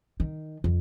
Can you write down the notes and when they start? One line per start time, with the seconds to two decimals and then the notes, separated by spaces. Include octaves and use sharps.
0.20 D#3
0.64 F2